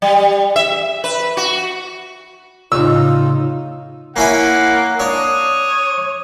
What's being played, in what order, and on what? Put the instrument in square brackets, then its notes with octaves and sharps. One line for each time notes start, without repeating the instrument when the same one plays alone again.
[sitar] G3
E5
B4
F#4
[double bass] A2 D#4 [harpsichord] C#3 [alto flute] F4 [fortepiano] E6
[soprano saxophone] A#3 [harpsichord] C#4 E4 G#5 [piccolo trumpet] F#5
[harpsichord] D4 [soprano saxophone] C#5 [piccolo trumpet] D#6